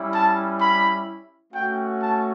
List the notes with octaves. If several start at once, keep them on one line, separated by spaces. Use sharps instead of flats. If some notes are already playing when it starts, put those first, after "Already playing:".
Already playing: G3 C#4 E4
A5
B5
A3 C#4 F#4 G5
A5